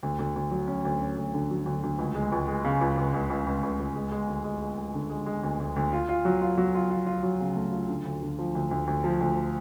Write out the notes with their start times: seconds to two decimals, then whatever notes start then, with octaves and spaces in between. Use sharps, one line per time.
0.03 D2
0.19 D2
0.36 D2
0.51 F#3
0.68 C#4
0.85 D2
1.01 C#4
1.17 D2
1.34 D3
1.50 F#3
1.66 D2
1.83 D2
1.98 C#2
2.15 G#3
2.32 C#2
2.48 G#3
2.64 C#3
2.81 C#2
2.97 C#2
3.14 C#2
3.30 C#2
3.46 C#2
3.63 C#2
3.80 C#2
3.95 G#3
4.11 G#3
4.28 D2
4.44 G#3
4.62 G#3
4.78 G#3
4.94 D3
5.10 G#3
5.26 G#3
5.43 D2
5.60 D2
5.76 D2
5.93 F4
6.09 F4
6.25 F#3
6.41 F4
6.57 F#3
6.75 F4
6.90 F4
7.06 F4
7.23 F#3
7.40 C#3
7.56 A3
7.72 F4
7.88 D3
8.05 D2
8.22 D3
8.39 F3
8.55 D2
8.71 D2
8.87 D2
9.04 F3
9.20 D2